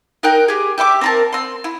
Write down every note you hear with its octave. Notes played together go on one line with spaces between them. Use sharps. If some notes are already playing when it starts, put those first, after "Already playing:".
D#4 A#4 G5 F#6
G4 G#4
G4 E5 C6 D6
C4 A#4 A5
C4 C6
E4